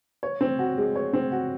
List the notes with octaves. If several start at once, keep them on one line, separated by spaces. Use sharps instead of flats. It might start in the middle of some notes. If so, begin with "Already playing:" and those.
C#5
C4
F#4
G#3
C#5
C4
F#4